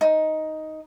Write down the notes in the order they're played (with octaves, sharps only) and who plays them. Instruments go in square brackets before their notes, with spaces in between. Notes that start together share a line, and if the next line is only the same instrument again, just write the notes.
[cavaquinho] D#4